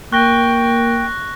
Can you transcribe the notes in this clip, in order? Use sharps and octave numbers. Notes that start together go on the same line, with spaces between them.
A#3 G5 C#6 F#6 A#6 G7